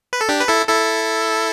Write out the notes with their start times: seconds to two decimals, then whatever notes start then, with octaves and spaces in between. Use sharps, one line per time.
0.13 B4
0.21 A4
0.29 D4 G4
0.40 B4
0.48 E4 A4
0.69 E4 A4